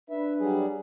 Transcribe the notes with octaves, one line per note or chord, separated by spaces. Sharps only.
D4 B4 E5
F#3 G3 G#4